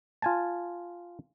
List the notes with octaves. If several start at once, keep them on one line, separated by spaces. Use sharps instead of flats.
F4 G#5 A5